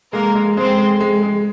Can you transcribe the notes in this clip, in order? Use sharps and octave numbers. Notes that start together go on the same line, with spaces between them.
G#3 A#3 A#4
G#3
G#3 C4 C5
G#3
G#3
G#3